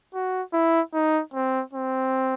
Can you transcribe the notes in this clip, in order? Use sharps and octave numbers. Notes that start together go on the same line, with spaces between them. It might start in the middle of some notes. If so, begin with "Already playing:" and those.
F#4
E4
D#4
C4
C4